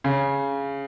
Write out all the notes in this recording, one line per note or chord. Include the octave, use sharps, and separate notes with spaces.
C#3